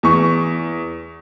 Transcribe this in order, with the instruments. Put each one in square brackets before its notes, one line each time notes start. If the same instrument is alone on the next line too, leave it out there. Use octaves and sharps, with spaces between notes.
[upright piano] E2 C#6